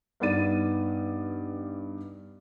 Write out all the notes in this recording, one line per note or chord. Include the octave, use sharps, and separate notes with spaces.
G2 B3 D#4 D5 A6 D#7